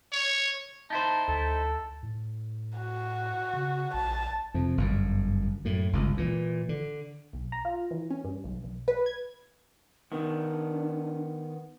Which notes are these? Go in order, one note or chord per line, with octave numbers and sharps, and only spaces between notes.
C#5
D#4 E4 C5 A5
D2 A4
A2
F#4
C#3
A#1 A5
F2 C3
G1 F#2
F#2 A2
G1 C#2
A#2 E3
D3
B1
A#5
F4
E3
C#4
G2
B1
B1
B4
G#6
D#3 B3 D4